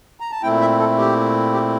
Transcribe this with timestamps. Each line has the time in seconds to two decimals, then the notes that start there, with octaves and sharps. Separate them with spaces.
0.20 A#5
0.31 A5
0.43 A#2 A3 C4 E4 G5
0.61 E5
0.79 A4
0.98 G4
1.53 G4